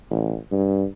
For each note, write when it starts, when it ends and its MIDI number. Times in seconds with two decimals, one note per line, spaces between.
0.10 0.36 33
0.52 0.85 43